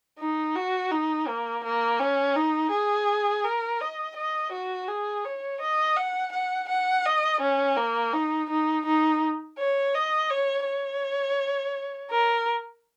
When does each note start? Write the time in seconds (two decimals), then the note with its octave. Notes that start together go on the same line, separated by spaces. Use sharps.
0.19 D#4
0.55 F#4
0.91 D#4
1.28 A#3
1.64 A#3
2.00 C#4
2.36 D#4
2.71 G#4
3.44 A#4
3.81 D#5
4.16 D#5
4.52 F#4
4.88 G#4
5.25 C#5
5.61 D#5
5.97 F#5
6.32 F#5
6.69 F#5
7.05 D#5
7.41 C#4
7.77 A#3
8.13 D#4
8.50 D#4
8.86 D#4
9.58 C#5
9.94 D#5
10.30 C#5
10.66 C#5
12.11 A#4